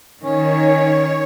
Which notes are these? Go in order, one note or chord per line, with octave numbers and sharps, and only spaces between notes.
D#3 C#4 C#5